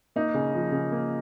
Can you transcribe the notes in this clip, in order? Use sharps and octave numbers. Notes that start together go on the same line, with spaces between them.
A#3 D#4
C#3
F3
C#3
A#3